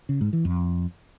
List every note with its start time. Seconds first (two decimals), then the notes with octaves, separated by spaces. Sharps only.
0.09 C#3
0.21 G#2
0.33 E3
0.45 F2